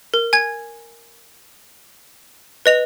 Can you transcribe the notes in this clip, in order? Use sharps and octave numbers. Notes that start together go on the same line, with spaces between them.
A#4
G#5 G#6
B4 D#5 F7